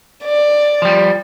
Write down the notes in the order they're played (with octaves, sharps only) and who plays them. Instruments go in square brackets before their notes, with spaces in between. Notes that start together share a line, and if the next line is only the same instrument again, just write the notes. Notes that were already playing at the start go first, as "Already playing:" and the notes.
[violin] D5
[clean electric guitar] F3 G3